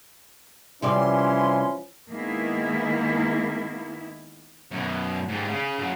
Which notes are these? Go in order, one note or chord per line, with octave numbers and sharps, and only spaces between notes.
C3 E3 F3 G3 C#4 D5 C6
D#3 G#3 A#3 B3 E4
F#2 B2
G#2 G3
C#3
C#3 F#3